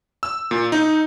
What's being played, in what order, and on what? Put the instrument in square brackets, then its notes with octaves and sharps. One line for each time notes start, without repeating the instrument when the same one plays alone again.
[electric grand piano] E6
A#2
D#4